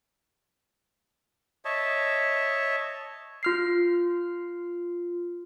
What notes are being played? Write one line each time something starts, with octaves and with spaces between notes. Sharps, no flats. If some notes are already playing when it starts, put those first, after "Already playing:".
C#5 D#5 E5 A5
F4 F6 C7